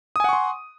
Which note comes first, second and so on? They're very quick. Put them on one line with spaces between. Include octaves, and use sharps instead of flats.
D#6 G#5 F#5 C#6 C6